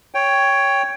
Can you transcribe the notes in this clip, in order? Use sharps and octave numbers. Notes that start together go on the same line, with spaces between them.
C#5 G5